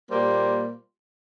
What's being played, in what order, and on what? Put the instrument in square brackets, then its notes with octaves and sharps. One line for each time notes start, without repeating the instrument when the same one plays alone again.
[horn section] A#2 G3 A#3 G4 C5